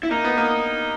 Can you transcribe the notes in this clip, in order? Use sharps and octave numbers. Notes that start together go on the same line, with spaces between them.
E4
A#3 D#4
B3
A#3